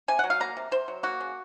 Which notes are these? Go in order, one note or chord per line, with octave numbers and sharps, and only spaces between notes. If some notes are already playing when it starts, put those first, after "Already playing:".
C3 G#5
F#3 F#5
F5
A#3 A#5
C3
C3 C5
F#3
A#3 F#4
C#3